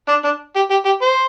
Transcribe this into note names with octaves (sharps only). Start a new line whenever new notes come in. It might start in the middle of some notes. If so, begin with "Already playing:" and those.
D4
D4
G4
G4
G4
C5